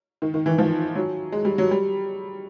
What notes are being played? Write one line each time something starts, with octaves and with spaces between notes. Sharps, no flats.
D#3
D#3
E3
F3
F#3
G#3
G3
F#3
G3